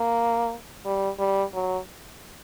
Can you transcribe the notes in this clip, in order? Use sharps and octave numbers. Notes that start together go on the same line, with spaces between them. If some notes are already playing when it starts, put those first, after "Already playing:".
Already playing: A#3
G3
G3
F#3